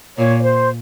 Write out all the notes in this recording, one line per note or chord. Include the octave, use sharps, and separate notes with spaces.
A#2 C#5
C5